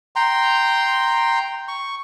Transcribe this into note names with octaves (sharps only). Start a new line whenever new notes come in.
G5 A#5 C6
C#6